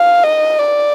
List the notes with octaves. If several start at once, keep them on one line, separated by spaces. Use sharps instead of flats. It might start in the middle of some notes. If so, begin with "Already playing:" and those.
Already playing: F5
D#5
D5